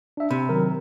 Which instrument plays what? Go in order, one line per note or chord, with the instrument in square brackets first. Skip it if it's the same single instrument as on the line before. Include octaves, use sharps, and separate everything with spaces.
[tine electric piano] D4 E5
[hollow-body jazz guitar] C3 [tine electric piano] B5
[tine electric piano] D#3 F#3 A#4